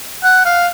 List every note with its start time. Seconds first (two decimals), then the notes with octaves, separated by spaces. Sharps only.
0.24 F#5
0.45 F5